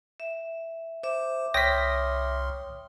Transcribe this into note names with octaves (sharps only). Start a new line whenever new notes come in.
E5
C5 E5 D6
C2 C#5 G5 C6 D#6 F6 A#6 B6